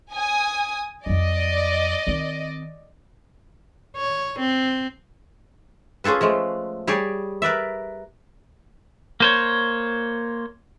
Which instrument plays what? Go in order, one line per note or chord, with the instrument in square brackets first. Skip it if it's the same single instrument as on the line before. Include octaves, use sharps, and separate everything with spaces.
[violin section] G#5 D#6
[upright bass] F2 F#3 [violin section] D5 D#5
[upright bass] D#3 C4
[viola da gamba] C#5
C4
[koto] C#4 F4 G#4 A4 B4
F3 G#3 A3
G3 G4 G#4 C#5 D5
A#4 B4 D5 E5
[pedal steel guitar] A#3 C5 C#5